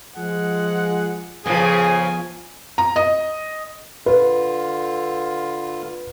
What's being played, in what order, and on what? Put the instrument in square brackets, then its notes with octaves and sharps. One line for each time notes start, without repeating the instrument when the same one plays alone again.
[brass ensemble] F3 G#3 G#4 F#5
[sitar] F2 C#3 [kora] F3 B3 [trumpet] G#4 [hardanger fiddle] G#5
[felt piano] A#5
D#5
[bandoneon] D3 F4 [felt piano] B4